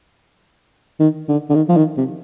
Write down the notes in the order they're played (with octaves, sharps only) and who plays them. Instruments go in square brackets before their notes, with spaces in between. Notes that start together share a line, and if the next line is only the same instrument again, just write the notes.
[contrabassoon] D#3
D3
D3
D#3
F3
D#3
C3